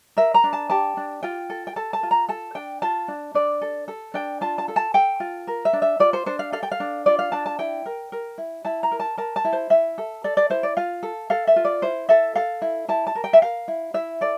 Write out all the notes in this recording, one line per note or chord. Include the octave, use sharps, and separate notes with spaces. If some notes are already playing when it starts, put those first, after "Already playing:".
A#4 E5
A#5
D4
A5
G4 A5
D4
F4 G5
A4
G5
A4 A5
A5
F4
A#5
A4 A5
D4 G5
F4 A5
D4
D4 D5
A4
A4
D4 G5
F4 A5
A5
A4
A5
A4 G5
F4
A#4
E5
D4
E5
F4 D5
C5
D4 C5
F5
A4 F5
G5
F5
D4
F4 D5
F5
D4 A5
A5
E4 G5
A#4
A#4
E4
E4 A5
A#5
A#4
A5
A#4 A5
A5
E4
C5
E4 E5
A4
A4 D5
D5
E4 C5
D5
F4 F5
A4
A4 F5
E5
F4
D5
E4 C5
A4 E5
A4 F5
E4
E4 A5
A5
A#4
G5
E5
A#4 F5
E4
E4 E5
A4 D5